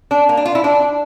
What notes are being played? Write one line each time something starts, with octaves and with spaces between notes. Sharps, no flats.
D4
A#3
D4
F4
E4
D4